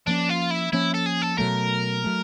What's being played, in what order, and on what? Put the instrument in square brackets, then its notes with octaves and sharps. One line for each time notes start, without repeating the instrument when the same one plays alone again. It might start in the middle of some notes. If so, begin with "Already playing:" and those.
[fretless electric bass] F3 A#3 C#4 [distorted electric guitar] D4
[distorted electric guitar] F4
E4
[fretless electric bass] F3 A#3 C#4 [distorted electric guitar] E4
[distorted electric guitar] A4
G#4
A4
[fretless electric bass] B2 F#3 A3 [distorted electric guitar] A#4
[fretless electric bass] F#3 A3